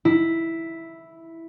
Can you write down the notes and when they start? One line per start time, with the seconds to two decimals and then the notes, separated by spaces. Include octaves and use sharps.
0.05 E4